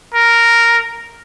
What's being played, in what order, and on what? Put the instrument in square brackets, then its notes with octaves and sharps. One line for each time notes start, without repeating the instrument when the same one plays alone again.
[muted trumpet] A#4